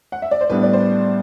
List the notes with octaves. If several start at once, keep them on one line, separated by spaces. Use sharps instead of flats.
F#5
E5
D5
C5
A2 G3 B3 D4 B4
D5
C5